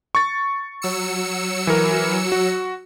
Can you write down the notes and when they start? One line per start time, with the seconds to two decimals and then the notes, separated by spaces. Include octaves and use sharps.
0.15 C#6 A6
0.82 F#3 E6 C#7
1.67 E3 A#4
2.32 F#4